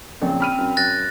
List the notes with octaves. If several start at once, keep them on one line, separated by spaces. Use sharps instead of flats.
A#1 C#3 C4
B5 F6 D#7
F#2
F#2 F#6 A6 A#6